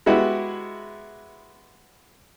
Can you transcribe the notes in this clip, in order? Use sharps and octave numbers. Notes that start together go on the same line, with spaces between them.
G#3 B3 E4 F#4 G4